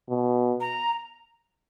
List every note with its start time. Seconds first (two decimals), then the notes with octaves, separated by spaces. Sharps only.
0.09 B2
0.60 A#5